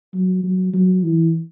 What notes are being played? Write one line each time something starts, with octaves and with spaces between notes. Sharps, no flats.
F#3
F#3
F#3
E3